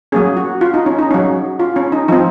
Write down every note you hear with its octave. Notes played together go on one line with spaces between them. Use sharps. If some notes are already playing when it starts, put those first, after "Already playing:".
F#3 A#3 C#4 G#4
F#4
F4
D#4
C#4
D#4
F#3 C#4
F4
C#4
D#4
F3 C4 D#4